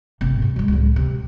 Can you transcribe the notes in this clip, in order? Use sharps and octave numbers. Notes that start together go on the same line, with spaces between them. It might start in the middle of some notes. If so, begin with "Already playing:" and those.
G#1 C3
F#2 C3
F#3 G#3
C#2 A2
C3